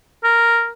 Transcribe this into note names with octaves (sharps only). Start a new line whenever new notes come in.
A#4